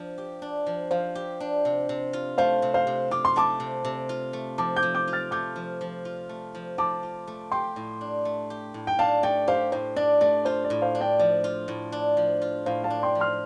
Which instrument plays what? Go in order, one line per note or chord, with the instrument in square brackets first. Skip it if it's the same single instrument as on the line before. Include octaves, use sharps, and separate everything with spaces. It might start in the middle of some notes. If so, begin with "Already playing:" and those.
Already playing: [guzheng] F3 D4
G4
D4
F3
[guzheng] F3 [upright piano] C5 F5
[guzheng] G4
D4
C3
C3
F4
[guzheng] A3 [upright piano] C5 F5
[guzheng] C3
[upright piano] C5 F5
[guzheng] C3
[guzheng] F4 [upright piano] D6
[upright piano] C6
[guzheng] A3 [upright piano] A5 D6
[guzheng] C3
C3
F4
A3
[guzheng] F3 [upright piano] A5 D6
[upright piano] D6 G6
[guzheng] F3
[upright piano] D6 G6
[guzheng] F4
[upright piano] F6 A6
[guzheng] A3 [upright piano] D6 G6
[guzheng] F3
F3
F4
A3
F3
[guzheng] F3 [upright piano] A5 D6
[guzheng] F4
A3
[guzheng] G4 [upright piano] G5 C6
[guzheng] A2
D4
A3
G4
A2
[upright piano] G5
[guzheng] D4 [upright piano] F5 A5
[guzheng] A3 [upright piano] D5 G5
[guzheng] G4 [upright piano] C5 F5
[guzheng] A2 [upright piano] C5
[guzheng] D4 [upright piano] D5
[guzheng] A3 [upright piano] D5
[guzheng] F4 [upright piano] C5
[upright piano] D5
[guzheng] A2
[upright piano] C5 F5
[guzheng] D4
[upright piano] D5 G5
[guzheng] F3 [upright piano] D5
[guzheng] F4
A2
D4
F3
F4
[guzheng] A2 [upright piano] C5 F5
[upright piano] F5 A5
[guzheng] D4
[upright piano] G5 C6
[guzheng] F3
[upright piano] C6 F6